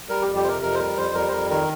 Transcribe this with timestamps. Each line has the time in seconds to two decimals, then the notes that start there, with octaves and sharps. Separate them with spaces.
0.09 G3 A#4
0.22 F2 G4
0.36 G4
0.44 C3 A#4 C5
0.62 F2 A#4
0.74 C5
0.79 G3 A#4
0.97 F2 C5
1.14 G3 A#4
1.28 C5
1.32 F2 A#4
1.50 D#3 A#4